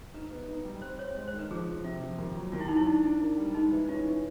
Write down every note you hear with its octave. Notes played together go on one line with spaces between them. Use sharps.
D#4 B4
B3
D#4
G3
C4 C5
C4 C#5
G#3 C#5
C5
D#3
B4
F3 G#4
F3
C3 F4
F3
D#2
F#3
D#2 F4
E4
F#3 D#4
E4
D4 D#4
D4
A#3
G3
G#3 D#4
E3
C#4 F4
E3